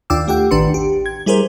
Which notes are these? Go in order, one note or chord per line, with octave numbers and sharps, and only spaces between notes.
D#2 D4 F4 G5 D6 E6
A3 G4 F#5 G5
A1 D#3 D4 B4 C6 C#7
G4
G#6
G3 E4 G#4 A#4 C5